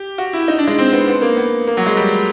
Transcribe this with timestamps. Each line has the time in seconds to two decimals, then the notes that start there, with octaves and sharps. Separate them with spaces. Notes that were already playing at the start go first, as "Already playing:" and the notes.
Already playing: G4
0.18 F#4
0.33 E4
0.48 D#4
0.59 D4
0.68 G#3
0.79 C4
0.93 B3
1.08 B3
1.22 A#3
1.37 B3
1.67 A#3
1.77 F#3
1.86 G#3
1.97 G3